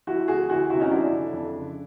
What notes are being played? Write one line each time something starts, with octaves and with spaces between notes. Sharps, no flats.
F3 E4 F#4
D2 F#4 G#4
D2 E4 F#4
C3 E4 F#4
C#4 D#4
F#3 D4 E4
F2
F2
C#3